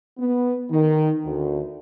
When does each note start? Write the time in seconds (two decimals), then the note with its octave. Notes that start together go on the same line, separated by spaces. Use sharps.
0.18 B3
0.70 D#3
1.25 D2